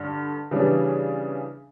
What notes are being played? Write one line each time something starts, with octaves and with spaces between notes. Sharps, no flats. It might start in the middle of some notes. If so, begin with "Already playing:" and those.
Already playing: G2 D3
C#3 E3 G3 B3 D4